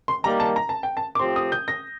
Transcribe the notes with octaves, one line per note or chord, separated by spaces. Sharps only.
C6
D#3 G3 A#3 A#5
A5
A#5
A5
G5
A5
D6
A2 F3 C4 G4 C6
D#6
G6
A#6